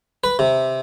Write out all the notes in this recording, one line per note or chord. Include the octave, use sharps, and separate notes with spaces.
B4
C3